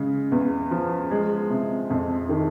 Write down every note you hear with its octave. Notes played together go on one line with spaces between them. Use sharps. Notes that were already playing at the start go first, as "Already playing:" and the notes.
Already playing: C#3 G#3
E2
F3
G#3
C3
F2
D#3